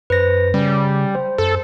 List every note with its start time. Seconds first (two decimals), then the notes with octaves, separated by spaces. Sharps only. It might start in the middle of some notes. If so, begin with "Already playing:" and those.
0.10 F#2 B4 C5 A#6
0.54 C#3 G3 C#4
1.15 C5
1.38 F#2 A4